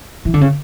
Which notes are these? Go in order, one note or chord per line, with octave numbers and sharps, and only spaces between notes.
E3
D3
C#3